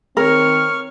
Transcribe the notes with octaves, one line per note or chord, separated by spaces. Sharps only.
D#3 C4 A#4 C#5 C#6 F6